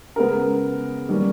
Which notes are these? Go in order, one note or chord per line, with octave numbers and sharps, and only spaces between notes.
C#3 G#3 B3 A#4
D#3 G3 A#3 C#4